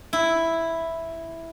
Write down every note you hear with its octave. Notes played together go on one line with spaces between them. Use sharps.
E4